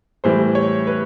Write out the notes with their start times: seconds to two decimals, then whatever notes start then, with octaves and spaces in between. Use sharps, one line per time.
0.24 A2 E3 G3 C5
0.55 C#5
0.87 B4